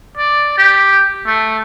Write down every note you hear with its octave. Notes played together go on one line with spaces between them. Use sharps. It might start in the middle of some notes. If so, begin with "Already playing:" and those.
D5
G4
A3